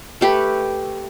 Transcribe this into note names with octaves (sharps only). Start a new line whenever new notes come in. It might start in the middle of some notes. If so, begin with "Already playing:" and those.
A3 G4 B4